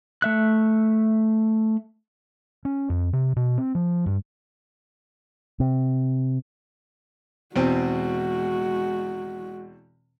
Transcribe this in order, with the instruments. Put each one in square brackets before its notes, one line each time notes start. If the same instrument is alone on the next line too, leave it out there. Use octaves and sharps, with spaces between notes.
[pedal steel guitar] A3 E5 F#6
[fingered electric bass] C#4
F2
C3
B2
C4
F3
G2
C3
[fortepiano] E2 B2 C4 [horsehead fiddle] G#3 F#4